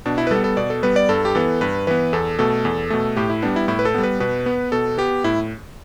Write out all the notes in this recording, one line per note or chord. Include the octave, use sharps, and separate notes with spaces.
B2 D4
E4
B4
G3 B3 A4
A4
B2 D5
A4
G3 B3 B4
D5
G2 A4
G4
E3 B3 A4
G2 B4
E3 B3 B4
E2 A4
B2 A3 A4
E2
B2 A3
A2 G4
E4
G3 B3 D4
E4
A2 E4
B4
A4
G3 B3
B4
B2 B4
B3
B2 A4
B3 G4
A2 E4